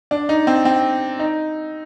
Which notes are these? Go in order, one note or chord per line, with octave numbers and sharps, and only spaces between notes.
D4
D#4
C4
C4
D#4